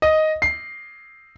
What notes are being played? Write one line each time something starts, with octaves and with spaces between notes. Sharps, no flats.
D#5
C7